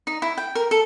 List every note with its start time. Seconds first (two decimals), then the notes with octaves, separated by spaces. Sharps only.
0.07 D#4
0.22 E4
0.38 G5
0.55 A#4
0.71 A4